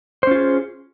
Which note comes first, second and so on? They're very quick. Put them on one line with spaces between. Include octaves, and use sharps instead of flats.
C5 C#4 F4 G#4